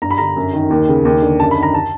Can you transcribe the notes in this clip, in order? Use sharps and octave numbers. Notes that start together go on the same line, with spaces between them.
G2 A#5
B5
D3 A#5
F#2
D#3
D#2
C#3
D#2
D3
F#2 A5
B5
D#3
A#5
A5